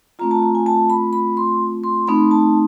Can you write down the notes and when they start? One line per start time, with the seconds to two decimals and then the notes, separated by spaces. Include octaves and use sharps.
0.19 A3 C4 F4 A#5
0.31 A5
0.43 A#5
0.55 G#5
0.66 A5
0.90 B5
1.13 B5
1.37 C6
1.84 C6
2.08 A3 C4 D#4 B5
2.31 A5